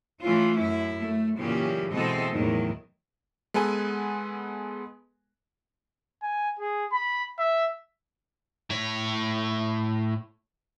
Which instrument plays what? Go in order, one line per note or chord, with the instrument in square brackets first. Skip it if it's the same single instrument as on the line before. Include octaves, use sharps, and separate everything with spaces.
[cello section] E3 A3 C#4 F4
F#2 E4
A3
A#2 C#3 E3 F#3 C#4 G4
B2 E3 G#3 C4 A4 D#5
E2 A2 D#3 F#3
[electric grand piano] G#3 B3 A4 B4 G#5
[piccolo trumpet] G#5
G#4
B5
E5
[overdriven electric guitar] A2 C#5